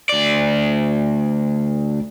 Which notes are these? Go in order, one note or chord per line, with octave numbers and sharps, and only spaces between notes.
D2 D5